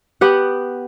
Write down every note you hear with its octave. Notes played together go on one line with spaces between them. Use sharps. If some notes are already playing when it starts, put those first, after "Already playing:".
B3 G4 F#5